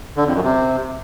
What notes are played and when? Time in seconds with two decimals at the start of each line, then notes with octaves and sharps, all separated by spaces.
0.17 D3
0.26 F2
0.34 F#2
0.43 C3